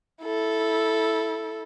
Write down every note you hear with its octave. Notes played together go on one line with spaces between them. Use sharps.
E4 A4